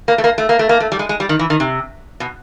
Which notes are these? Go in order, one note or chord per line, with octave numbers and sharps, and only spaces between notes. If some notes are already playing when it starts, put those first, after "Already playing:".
A#3
A3
A#3
A3
A#3
A3
A#3
A3
G3
G#3
G#3
G3
D#3
E3
D#3
C3
B2